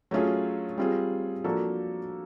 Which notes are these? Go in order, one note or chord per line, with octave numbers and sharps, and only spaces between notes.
F#3 A3 C#4 F4 G#4
G3 C4 F4 G#4
F3 A#3 D4 F#4 A4